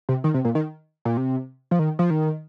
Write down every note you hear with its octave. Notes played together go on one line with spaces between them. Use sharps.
C3
D#3
C3
A#2
D#3
A#2
C3
F3
D#3
F3
D#3